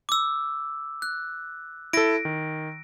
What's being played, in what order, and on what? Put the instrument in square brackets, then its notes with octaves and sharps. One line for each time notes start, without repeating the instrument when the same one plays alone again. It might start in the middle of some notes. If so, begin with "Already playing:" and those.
[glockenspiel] D6 E6
F#6
[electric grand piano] E4 A4 [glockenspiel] A#6 D7
[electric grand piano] D#3